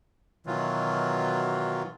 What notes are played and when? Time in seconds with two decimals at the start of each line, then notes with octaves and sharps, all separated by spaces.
0.46 B2 D#3 E3 F#3 F4